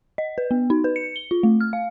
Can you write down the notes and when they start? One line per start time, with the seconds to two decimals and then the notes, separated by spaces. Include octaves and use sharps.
0.18 D#5
0.38 B4
0.51 B3
0.70 D#4
0.84 B4
0.96 C#7
1.16 G7
1.31 F4
1.43 A3
1.61 F6
1.73 F5